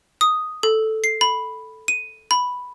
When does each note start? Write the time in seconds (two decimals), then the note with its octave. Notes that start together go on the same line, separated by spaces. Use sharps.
0.21 D#6
0.63 A4
1.04 C7
1.21 B5
1.88 D#7
2.31 B5